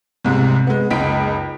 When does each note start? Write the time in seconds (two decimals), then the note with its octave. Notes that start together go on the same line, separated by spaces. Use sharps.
0.24 C2 G#2 C3
0.67 G#3 B3
0.90 F#1 C#2 D#4 B6 D7